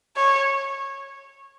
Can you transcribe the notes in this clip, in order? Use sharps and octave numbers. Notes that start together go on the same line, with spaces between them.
C#5